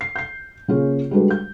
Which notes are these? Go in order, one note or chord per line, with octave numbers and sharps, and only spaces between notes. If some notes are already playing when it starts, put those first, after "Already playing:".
C7
G6 C7
C#3 A#3 C#4 F4 G#4
G3 G#3 D4 F#4 A4 B4
G6